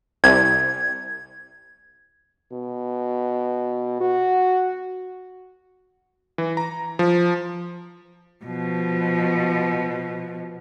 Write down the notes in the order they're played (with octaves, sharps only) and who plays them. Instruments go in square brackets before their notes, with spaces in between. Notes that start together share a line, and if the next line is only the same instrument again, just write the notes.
[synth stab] C2 [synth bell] G#6
[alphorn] B2
F#4
[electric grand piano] E3
A#5
F3
[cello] B2 F3